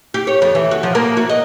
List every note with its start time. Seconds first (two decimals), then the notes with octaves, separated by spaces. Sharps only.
0.14 G4
0.27 C#5
0.42 F2
0.55 E3
0.71 F#4
0.83 F3
0.95 A#3
1.17 F#4
1.29 D#5